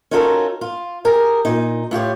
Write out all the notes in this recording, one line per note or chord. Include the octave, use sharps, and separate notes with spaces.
C#4 D#4 F4 F#4 A4 A#4
F4
G4 G#4 A#4
A#2 D#4
A2 F4 G4 C#5